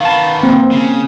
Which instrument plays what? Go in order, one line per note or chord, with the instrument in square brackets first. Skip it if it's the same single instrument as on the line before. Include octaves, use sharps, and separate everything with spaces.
[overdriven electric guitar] D#3 B3 [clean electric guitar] F5 A5
[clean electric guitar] A#3 [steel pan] C4
[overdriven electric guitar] C#3